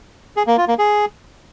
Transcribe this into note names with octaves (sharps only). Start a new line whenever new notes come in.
G#4
A#3
F4
A#3
G#4